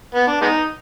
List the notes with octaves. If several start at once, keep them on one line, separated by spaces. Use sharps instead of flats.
B3
D4
G#3 B3 D#4